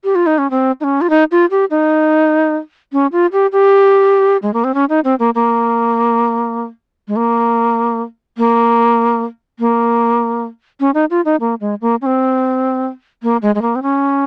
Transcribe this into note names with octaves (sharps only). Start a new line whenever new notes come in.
G4
F4
D#4
C#4
C4
D#4
C#4
F4
D#4
F4
G4
D#4
C#4
F4
G4
G4
G#3
A#3
C4
C#4
D#4
C4
A#3
A#3
G#3
A#3
A#3
A#3
C#4
D#4
F4
D#4
A#3
G#3
A#3
C#4
C4
A#3
G#3
G#3
A#3
C4
C#4